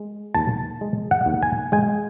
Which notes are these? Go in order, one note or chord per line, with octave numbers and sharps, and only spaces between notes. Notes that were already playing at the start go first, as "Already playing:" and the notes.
Already playing: G#3
D#2 A5
G#3
F#5
D#2
G#5
G#3 G#5